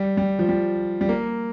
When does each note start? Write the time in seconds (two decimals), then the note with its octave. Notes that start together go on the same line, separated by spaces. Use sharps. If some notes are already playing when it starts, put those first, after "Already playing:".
Already playing: G3
0.17 G3
0.39 F3
0.49 G3
1.01 G3
1.09 A#3